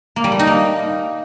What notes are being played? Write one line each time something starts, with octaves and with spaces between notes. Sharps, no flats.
A#3
G3
A3
D#4
A#3